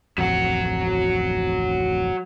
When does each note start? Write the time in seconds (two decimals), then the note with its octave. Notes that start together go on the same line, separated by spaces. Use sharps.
0.18 D1 A1 F2 F#3 F#4